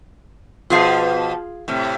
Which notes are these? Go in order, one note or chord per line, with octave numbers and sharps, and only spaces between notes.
B2 F3 F4 G#4 F5
A2 C3